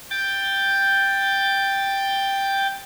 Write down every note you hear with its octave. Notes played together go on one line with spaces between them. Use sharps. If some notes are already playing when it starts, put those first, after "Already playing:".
G5 G6 A6